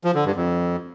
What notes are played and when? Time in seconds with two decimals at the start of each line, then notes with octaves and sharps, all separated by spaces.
0.04 F3
0.15 D3
0.25 G2
0.35 F2